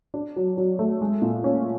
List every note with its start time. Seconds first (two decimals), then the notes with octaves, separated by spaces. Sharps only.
0.14 D4
0.36 F#3
0.57 F#3
0.79 A3
1.01 G#3
1.22 A#2
1.44 C#4